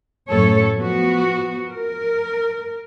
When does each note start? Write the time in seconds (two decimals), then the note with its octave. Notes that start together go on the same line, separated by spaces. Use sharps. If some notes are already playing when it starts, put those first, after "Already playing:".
0.30 F#2 A2 A3 A4 C#5
0.76 F3 B3 F#4
1.69 A#4